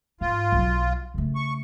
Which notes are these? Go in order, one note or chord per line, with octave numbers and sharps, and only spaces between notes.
G#2 F4
B1 F#3
C#3 A3
C#6